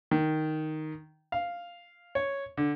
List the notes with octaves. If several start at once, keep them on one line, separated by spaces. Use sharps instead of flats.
D#3
F5
C#5
D3